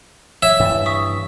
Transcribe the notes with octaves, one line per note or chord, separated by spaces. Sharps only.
C#5 E5 E7
G2 E3
C#6 D#6 B6